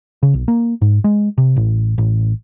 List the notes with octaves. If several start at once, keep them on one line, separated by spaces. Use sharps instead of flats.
C#3
B1
A#3
G#2
G#3
C3
A1
A1